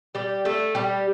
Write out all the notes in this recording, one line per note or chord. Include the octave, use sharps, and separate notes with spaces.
G3 G4
A3 A4
G3 G4